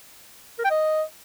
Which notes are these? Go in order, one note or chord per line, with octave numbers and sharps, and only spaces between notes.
A#4
G5
D#5